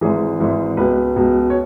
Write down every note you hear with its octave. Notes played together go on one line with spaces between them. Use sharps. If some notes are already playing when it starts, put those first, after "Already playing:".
G#1 G#2 E3 G#4
G#1 G#2 E3
C#2 B2 B4
C#2 B2
C#5